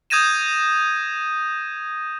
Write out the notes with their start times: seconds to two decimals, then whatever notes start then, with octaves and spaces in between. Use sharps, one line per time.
0.10 D#6 G6 G#6 A#6 D#7 E7